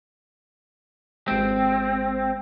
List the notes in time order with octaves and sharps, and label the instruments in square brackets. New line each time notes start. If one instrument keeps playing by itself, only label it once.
[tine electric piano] G#1 G#3 [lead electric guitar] C4